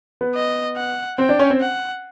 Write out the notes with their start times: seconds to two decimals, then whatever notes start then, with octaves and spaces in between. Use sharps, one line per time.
0.21 B3 B4
0.35 D#5
0.76 F#5
1.18 C4 C5 G5
1.29 D4 D5
1.39 C#4 C#5
1.50 C4 C5
1.61 F#5